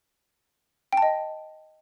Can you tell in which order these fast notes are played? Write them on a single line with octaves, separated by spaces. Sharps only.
G5 A5 D#5